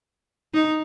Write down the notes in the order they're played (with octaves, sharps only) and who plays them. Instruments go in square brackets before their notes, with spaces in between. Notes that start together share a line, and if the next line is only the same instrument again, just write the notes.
[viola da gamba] D#4